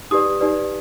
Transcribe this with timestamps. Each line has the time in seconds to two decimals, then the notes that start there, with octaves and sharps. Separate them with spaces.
0.11 D#4 G4 B4 D5 D#6
0.41 D#4 G4 B4 D5